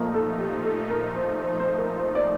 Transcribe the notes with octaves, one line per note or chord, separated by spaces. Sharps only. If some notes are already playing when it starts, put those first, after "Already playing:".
Already playing: A#2 F3 A3 A#3 D#4
A4
G4
A4
A#4
C5
C5
C5
A#4
C5
D5